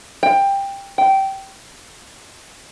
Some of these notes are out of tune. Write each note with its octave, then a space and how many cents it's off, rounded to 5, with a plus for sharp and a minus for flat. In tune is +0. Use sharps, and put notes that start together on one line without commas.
G5 +15
G5 -15